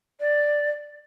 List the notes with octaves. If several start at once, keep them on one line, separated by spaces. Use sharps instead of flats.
D5